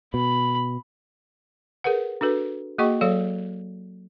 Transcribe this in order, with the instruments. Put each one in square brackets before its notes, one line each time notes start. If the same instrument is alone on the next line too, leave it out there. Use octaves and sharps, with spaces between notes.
[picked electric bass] B2 [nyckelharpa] B5
[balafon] G#4 A#4 B4 F#5
D4 F#4 A4 B4
A#3 F#4 G#4 D#5 G5 C#6
F#3 A4 C#5 F5